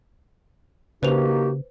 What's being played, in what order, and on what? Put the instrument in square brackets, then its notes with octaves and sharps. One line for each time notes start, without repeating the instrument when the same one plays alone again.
[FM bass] C#3 [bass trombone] A#3 [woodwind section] D#4 F#4 G4 [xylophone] B4 C5 F7